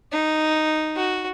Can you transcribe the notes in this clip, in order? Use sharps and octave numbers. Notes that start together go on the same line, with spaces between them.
D#4
F#4